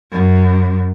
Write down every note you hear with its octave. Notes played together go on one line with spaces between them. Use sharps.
F#2